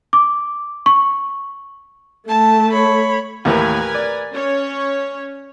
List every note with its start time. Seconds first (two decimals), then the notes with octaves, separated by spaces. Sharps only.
0.13 D6
0.86 C#6
2.28 A3 A5
2.72 C#5 B5
3.45 D#2 A2 E3 A#4 B4 G#5
3.94 D5
4.33 C#4 C#5